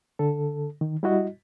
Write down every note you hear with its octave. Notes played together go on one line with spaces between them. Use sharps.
D3 A4
D#3
G3 E4 F#4 D#5